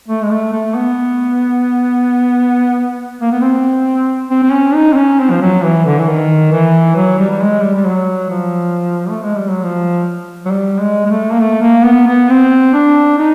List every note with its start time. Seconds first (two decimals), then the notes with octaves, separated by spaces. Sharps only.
0.08 A3
0.23 G#3
0.31 A3
0.53 A3
0.75 B3
3.21 A#3
3.32 B3
3.41 C4
4.30 C4
4.43 C4
4.52 C#4
4.75 D#4
4.93 C4
4.97 C#4
5.20 C4
5.31 F3
5.42 F#3
5.63 E3
5.86 D3
5.99 E3
6.08 D#3
6.52 E3
6.96 F#3
7.19 G3
7.31 G3
7.41 G#3
7.63 G3
7.75 G3
7.85 F#3
8.30 F3
9.09 A3
9.23 G#3
9.37 G3
9.49 F#3
9.63 F3
10.45 F#3
10.51 G3
10.81 G#3
11.06 G#3
11.10 A3
11.32 A#3
11.41 A3
11.62 A#3
11.85 B3
12.07 B3
12.29 C4
12.73 D4
13.18 D#4